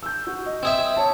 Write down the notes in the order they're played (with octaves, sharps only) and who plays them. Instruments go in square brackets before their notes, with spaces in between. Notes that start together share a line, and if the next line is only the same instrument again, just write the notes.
[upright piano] E6 G6
F#4
D#5
[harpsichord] C4 G#4 E5
[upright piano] C#5 A5